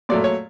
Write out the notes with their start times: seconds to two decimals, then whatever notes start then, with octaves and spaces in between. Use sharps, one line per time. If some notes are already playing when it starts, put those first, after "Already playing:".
0.09 A#2 F#3 A3 D5
0.24 C#5